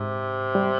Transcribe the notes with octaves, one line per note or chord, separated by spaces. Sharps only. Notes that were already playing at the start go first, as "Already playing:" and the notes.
Already playing: G#2 C3
G3